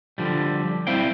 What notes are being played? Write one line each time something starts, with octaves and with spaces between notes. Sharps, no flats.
D3 F3 G3
G3 C4 E4 C5 F5 G5